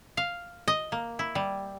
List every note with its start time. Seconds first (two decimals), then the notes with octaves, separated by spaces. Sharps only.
0.17 F5
0.68 D#5
0.92 A#3
1.19 E4
1.35 G3